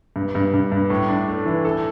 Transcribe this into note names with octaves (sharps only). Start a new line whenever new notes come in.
G2
G2
G2
G2
A2
D4
A3
E3
A4